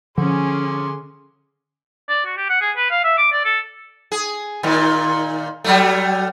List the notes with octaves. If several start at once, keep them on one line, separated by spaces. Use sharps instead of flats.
D3 F3 C#4 G#4 C6 D6
D5
F#4
G4
F#5
G#4
B4
F5
E5
D6
D5
A4
G#4
A#2 D#3
F#3 G3 A3